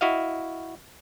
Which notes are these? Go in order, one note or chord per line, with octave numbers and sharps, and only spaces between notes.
E4 F#4 D#5 F5